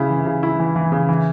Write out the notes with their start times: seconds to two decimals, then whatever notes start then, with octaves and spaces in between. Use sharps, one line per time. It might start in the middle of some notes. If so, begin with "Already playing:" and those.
Already playing: C#3 E4
0.10 E3
0.25 C#3
0.43 E4
0.59 E3
0.76 E3
0.92 C#3
1.09 E3